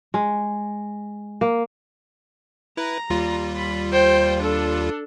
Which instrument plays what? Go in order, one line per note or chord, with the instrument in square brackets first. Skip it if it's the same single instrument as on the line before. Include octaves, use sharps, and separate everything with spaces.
[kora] G#3
A#3
[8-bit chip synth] E4 B4 [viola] A#5
[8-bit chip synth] D#2 G3 F4
[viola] B5
C5 G5
D4 A4